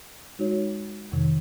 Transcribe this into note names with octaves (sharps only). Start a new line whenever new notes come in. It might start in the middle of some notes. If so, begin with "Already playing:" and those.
G#3 D#4 F#4 C#5
F2 C3 D#3